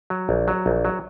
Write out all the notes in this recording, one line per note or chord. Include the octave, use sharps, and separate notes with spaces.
F#3
A#1
F#3
A#1
F#3